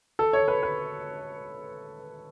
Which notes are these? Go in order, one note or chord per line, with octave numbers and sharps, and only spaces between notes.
A4
C#5
B4
B4